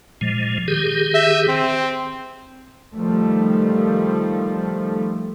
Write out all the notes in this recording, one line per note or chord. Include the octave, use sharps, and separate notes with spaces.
A#2 F3 G#3
D#3 G4 G#4
E5
C4
D#3 F3 G3 A3